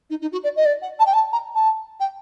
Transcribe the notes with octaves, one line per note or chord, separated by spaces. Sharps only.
D#4
D#4
F#4
D5
D#5
D5
F#5
A5
G5
A5
A#5
A5
G5